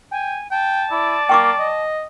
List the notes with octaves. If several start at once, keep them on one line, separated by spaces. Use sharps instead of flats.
G5 G#5
G5 A5
E4 D5
A#3 G5 C#6 D6
D#5